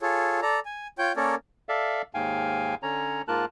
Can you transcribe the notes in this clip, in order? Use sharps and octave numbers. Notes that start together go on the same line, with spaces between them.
F4 G#4 A4 C#5
A4 D5 A#5
G#5
F4 C#5 G5 G6
A#3 C#4 A4 A#4 C#5 D5
A4 D5 E5 F5
D#2 G#2 F5 G5 G#5
D3 C#4 C#5 A#5
G#2 A#3 F4 A#4 A5 F#6